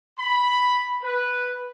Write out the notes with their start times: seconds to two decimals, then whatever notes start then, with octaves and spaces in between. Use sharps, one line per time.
0.19 B5
1.03 B4